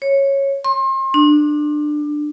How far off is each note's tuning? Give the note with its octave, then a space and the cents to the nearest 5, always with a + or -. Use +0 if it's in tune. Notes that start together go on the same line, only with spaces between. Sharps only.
C#5 -10
C6 +35
D4 +20